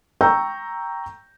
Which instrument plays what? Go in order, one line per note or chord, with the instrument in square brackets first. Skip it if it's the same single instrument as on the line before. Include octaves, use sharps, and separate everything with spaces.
[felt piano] G5 A#5 C#6 E6 G6